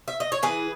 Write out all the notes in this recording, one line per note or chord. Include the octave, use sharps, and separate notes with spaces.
E5
D#5
C#5
E3 G#4 B4